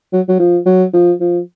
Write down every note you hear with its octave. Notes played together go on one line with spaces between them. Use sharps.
F#3
F#3
F3
F#3
F3
F3